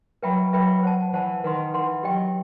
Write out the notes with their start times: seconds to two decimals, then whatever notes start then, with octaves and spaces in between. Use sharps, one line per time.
0.23 F#3 B4 E5 G5 B5
0.53 F#3 B4 E5 G5 B5
0.83 C5 F#5 A5
1.13 E3 C5 F#5 A5
1.44 D#3 B4 F#5 C6
1.73 E3 B4 F#5 C6
2.03 F#3 G4 D#5 G5